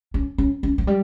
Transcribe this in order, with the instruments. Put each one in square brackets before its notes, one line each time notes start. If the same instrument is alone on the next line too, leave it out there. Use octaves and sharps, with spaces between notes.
[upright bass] C#4
C#4
C#4
F#3
G3